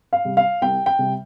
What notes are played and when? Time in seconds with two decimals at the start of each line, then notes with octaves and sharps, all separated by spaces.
0.13 F5
0.25 C3 G3
0.37 F5
0.62 C2 G5
0.86 G5
0.99 C3 G3